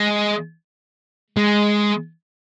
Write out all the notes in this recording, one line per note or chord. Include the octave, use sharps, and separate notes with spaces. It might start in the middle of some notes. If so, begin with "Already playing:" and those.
Already playing: G#3
G#3